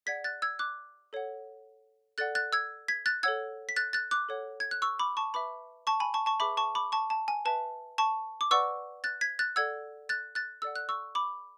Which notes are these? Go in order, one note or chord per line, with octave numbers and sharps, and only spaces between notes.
G#4 D5 F#5 G#6 B6
F#6 A6
E6 G#6
D6 F#6
A4 C#5 F#5
A4 D5 F#5 F#6 A6
F#6 A6
E6 G#6
G#6 B6
F#6 A6
A4 C#5 F#5 E6 G#6
B6
F#6 A6
F#6 A6
D6 F#6
A4 C#5 F#5
G#6
F#6
C#6 E6
B5 D6
A5 C#6
B4 E5 B5 D6
A5 C#6
G#5 B5
A5 C#6
A5 C#6
G#4 B4 E5 B5 D6
A5 C#6
B5 D6
A5 C#6
A5
G#5
B4 E5 A5
A5 C#6
D6
B4 D5 F#5 C#6 E6
F#6 A6
G#6 B6
F#6 A6
A4 D5 F#5 E6 G#6
F#6 A6
F#6 A6
A4 D5 F#5 E6
F#6
C#6 E6
B5 D6